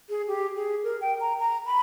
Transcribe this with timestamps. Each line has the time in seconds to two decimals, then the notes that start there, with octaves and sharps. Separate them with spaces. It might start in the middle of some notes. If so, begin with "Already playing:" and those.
0.09 G#4
0.27 G4
0.56 G#4
0.84 A#4
1.01 G5
1.20 A#5
1.38 A#5
1.66 B5